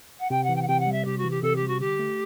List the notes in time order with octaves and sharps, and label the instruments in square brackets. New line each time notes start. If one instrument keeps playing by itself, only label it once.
[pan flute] F#5
[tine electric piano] C3 [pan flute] G5
[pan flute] F#5
[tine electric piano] E3
[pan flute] G5
F#5
[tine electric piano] C3 [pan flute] G5
[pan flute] F#5
[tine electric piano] G3
[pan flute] E5
[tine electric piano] C3 [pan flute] G4
[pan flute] F#4
[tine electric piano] E3
[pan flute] G4
[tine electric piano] C3 [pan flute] A4
[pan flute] G4
[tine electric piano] G3
[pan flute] F#4
[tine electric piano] D3 [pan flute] G4
[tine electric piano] A3